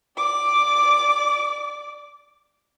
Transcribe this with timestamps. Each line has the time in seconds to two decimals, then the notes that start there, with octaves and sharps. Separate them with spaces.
0.17 D5 D6